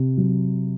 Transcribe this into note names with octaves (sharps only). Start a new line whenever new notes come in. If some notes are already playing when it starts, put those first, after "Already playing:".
Already playing: C3
F#3